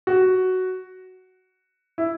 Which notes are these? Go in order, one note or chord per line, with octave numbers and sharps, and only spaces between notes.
F#4
E4